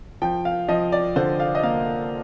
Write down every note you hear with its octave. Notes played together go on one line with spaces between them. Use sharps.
F3 G5
F5
F3 D#5
D5
D3 C5
F5
D#5
A#3 F5